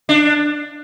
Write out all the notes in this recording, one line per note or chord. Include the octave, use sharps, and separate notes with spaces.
D4